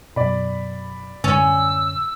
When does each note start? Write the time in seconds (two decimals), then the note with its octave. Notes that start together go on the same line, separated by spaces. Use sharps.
0.16 F#2 B2 D5 B5
1.24 F#2 A2 D3 C#4 E6